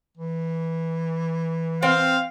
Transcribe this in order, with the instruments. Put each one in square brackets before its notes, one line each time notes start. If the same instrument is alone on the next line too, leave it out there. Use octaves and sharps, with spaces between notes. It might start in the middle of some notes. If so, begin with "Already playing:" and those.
[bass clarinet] E3
[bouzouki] C4 [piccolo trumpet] F5